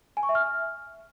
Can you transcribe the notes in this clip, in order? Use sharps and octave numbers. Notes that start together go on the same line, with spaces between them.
G#5
C#6
E5
F6